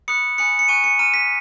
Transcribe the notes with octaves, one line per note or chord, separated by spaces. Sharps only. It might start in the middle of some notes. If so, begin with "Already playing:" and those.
B5 D#6 F#6 C#7
G#5 B5 D#6 F#6 C#7
C#7
G#5 C#6 F#6 D#7
C#7
A#5 F6 D#7
B6